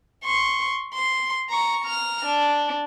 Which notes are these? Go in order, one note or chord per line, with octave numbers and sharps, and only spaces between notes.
C6 C#6
C6
A#5 C#6
A#5 F6
D4